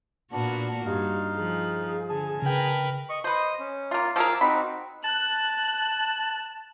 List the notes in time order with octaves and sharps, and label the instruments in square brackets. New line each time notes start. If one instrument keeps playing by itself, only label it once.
[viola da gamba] A#2 A#3 F#4 [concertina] B3 D4
[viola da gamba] G2 [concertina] D#4 F5 [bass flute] G4
[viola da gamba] F3 [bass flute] G#4
[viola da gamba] D3 [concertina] G#5 A5
[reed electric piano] C#3 G5 [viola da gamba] A#4 B4
[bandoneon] D#5 C#6
[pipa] B4 C5 [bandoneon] D#5 D#6
[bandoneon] C#4
[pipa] A#3 F4
[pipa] F3 G#4 A#4 [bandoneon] D6 E6 F6
[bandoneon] C4 D#4 F#4 [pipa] B5
[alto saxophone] A5 [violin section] F#6